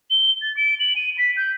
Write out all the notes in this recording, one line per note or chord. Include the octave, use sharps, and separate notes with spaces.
G7
A6
D7
F#7
D#7
B6
G6